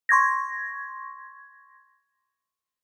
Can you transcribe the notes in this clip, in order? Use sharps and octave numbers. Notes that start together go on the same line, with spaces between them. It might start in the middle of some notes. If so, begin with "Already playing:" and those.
C6 C#6 G#6 A#6